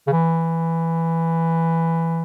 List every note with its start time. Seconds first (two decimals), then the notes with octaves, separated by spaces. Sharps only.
0.07 C#3
0.12 E3